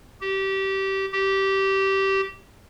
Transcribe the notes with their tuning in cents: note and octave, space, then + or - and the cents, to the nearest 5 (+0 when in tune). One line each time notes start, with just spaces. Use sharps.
G4 -20
G4 -15